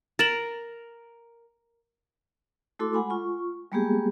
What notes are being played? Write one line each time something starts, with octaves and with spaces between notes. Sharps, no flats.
A#4 A6 E7 F#7
A3 E4 F#4 A4 C6 D6
G#3 F#5 G#5 B5
F4 C#6
G3 G#3 A#3 B3 G4 G#4